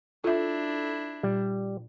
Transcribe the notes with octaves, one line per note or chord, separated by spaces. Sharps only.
D4 E4 F4 A4 E5
A#2 G3